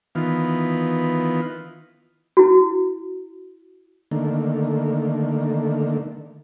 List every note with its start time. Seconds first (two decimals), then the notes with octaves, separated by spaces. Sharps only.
0.15 D#3 E3 B3 F4
2.37 E4 F#4
4.11 D3 D#3 A3 A#3